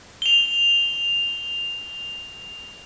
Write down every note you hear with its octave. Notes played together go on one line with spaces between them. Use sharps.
F7 G7